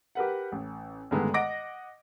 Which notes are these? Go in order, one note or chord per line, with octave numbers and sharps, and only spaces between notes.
G4 A#4 B4 F#5
A1
G2 D3 D#3 G#3 A3 B3
D#5 F#5 D6 A#6 D7